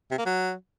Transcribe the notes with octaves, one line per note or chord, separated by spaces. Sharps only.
C3
A#3
F#3